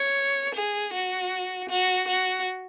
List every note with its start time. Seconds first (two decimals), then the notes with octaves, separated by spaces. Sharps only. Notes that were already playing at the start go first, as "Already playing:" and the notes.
Already playing: C#5
0.55 G#4
0.93 F#4
1.69 F#4
2.07 F#4